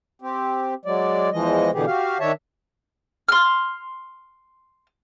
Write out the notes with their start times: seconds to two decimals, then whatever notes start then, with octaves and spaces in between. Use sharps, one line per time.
0.22 C4 G4
0.85 F#3 G#3 D5
1.32 E2 E3 F3 G#3 D#5
1.73 B2 D3 E3 B3 G4 G#4
1.87 F#4 G4 F5
2.20 D#3 D4 C#5 E5 A5
3.29 C6 F6